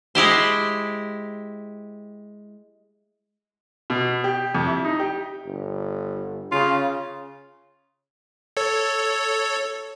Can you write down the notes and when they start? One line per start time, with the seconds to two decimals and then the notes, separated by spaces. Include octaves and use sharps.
0.15 G#3 E4 G4 C5
3.90 B2
4.24 G4
4.55 F2
4.67 E4
4.85 D#4
5.00 G4
5.46 G1
6.52 C#3 F4
8.57 A4 C#5